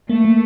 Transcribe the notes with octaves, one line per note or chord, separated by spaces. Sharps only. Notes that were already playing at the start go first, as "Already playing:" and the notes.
A3 A#3
A#3